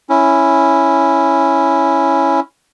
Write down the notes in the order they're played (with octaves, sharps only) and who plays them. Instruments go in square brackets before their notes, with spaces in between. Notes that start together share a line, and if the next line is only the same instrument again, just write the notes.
[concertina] C#4 E4